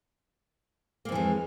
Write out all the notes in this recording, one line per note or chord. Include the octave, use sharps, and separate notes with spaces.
F2 E3 G#3 A#3